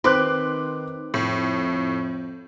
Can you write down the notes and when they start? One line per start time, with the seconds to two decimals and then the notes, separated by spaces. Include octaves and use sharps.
0.04 D#3 C4 B4 C6 D6 F#6
1.14 F2 A2